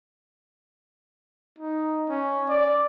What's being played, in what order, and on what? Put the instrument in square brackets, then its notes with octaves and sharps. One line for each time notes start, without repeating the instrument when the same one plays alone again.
[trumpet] D#4
C#4
D5